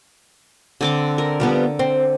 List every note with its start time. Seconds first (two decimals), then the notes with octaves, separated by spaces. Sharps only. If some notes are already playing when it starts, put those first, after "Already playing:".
0.81 D3 C4 D6
1.18 A#4
1.40 F3 G3 B3
1.79 C4